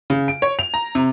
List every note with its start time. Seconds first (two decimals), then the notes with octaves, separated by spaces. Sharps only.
0.10 C#3
0.28 D7
0.42 C#5
0.59 F7
0.74 A#5
0.95 C3